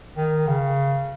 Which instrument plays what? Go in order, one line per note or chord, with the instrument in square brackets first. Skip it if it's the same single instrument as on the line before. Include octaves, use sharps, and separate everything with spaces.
[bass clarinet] D#3
C#3